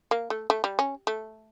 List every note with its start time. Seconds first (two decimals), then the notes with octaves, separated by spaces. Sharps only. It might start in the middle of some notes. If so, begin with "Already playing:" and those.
0.11 A#3
0.30 A3
0.50 A3
0.64 G3
0.79 C#4
1.07 A3